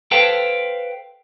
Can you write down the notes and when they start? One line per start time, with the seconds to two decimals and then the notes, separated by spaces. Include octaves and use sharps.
0.11 A4 B4 C5 F5 G5 A5